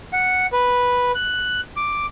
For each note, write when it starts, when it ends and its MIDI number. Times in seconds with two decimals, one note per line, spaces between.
0.13 0.46 78
0.53 1.11 71
1.15 1.61 90
1.77 2.06 86